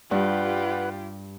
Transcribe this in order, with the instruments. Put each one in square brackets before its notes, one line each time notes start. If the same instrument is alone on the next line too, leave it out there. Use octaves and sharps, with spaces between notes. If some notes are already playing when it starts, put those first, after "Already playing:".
[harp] G2 [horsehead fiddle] F4 G4 [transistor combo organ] B4 F#5